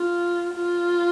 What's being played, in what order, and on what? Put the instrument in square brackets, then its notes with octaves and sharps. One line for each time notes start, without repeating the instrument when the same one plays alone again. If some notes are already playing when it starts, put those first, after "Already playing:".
Already playing: [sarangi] F4
F4